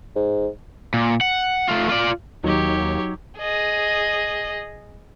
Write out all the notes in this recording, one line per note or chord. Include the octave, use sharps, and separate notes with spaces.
G#2
A#2
F#5
A3 F4
F4 D5
D#2 F#3 D#4 G4 C#5
G#4 D#5